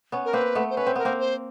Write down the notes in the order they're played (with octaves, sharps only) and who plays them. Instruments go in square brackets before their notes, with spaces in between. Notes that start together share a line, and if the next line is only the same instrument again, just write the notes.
[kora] B3 C#4
[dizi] A#4
[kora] A#3 C4 [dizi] B4
[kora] A3 B3
[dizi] C5
[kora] C#4 [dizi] B4
[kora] C4
[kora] B3 [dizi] A#4
[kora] A#3 C4
[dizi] C5